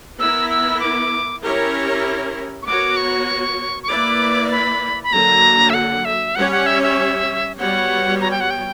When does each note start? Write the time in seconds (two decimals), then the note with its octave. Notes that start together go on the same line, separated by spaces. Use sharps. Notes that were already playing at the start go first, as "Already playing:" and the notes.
0.19 B3 E4 A#4 E6
0.50 E6
0.80 D6
1.42 C#4 E4 G4 A#4 C#5
2.62 C#6
2.66 B3 F#4 A#4 C#5 D6
2.97 C#6
3.83 C#6
3.89 A#3 E4 B4 D5 D6
4.51 B5
5.03 B5
5.12 D3 F#3 A#3 A#5
5.70 E5
5.74 F#5
6.05 E5
6.35 G3 C#4 G4 C#5 F#5
6.52 F#5
6.66 E5
6.83 E5
7.59 G3 B3 F#4 C#5 F#5
8.21 A#5
8.31 G5
8.40 F#5
8.50 G5